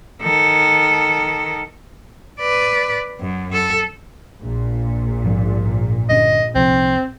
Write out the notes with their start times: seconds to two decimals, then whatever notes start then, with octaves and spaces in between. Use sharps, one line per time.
0.22 D#3 A4
2.40 B4 D5
3.20 F#2
3.53 A4
4.41 A#1 A#2
5.25 G#2 F3 G3
6.09 G1 G2 C#4 D#5
6.55 C2 C3 F3 C4